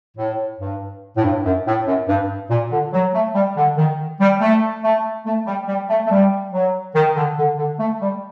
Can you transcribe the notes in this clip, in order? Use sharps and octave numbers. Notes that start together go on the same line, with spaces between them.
A2
G2
A2
G2
F#2
A2
F#2
G2
A#2
D3
F#3
A3
G3
D3
D#3
G3
A3
A3
A3
G3
G3
A3
A3
G3
F#3
D#3
D3
D3
D3
A3
G3